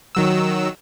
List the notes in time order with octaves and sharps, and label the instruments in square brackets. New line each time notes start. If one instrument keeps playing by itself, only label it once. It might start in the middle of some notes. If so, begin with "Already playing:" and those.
[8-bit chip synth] D#3 F#3 E6